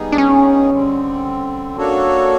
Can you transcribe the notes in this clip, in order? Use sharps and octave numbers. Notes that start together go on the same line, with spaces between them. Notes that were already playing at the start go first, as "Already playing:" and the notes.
Already playing: G3 B3 D#4 G#4
D4
C#4
D3 G3 C4
A#3 D4 F#4 A4 C#5